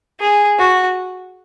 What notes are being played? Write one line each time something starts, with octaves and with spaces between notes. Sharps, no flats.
G#4
F#4